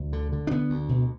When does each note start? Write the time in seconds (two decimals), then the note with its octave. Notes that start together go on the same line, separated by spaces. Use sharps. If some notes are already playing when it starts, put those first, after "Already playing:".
Already playing: D2
0.13 D3
0.32 D3
0.47 D4
0.51 D3 B3
0.70 D2
0.89 B2